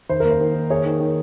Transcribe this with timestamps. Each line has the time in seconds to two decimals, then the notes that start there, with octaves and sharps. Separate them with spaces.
0.09 D#3 C5
0.20 A#3 A#4
0.31 C5
0.40 D#3
0.55 D#4
0.70 G#4 C#5
0.85 D#3
1.00 D#3